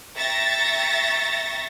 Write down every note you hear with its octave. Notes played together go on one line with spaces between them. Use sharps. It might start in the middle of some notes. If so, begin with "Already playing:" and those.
E5 G5 A#5 C#6 A6 A#6